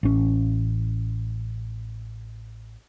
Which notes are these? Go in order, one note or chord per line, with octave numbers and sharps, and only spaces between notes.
A1 C#4